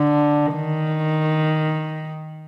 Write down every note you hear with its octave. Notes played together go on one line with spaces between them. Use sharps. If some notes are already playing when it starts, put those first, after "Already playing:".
Already playing: D3
D#3